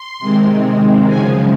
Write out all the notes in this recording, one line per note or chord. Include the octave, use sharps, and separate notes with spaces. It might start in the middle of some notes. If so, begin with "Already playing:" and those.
Already playing: C6
C3 D#3 G#3 C4
F#2 C#3 F3 G#3 G#5